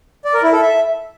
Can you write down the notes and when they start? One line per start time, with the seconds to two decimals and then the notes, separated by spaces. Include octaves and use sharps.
0.25 D5
0.34 A#4
0.43 E4
0.52 A4
0.62 E5